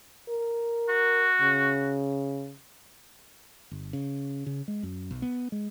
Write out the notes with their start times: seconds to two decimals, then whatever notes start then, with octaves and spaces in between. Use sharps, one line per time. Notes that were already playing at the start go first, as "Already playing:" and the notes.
0.29 A#4
0.89 F#4
1.41 C#3
3.71 G1
3.93 C#3
4.46 C#3
4.68 G#3
4.83 F#2
5.11 B1
5.22 B3
5.52 G#3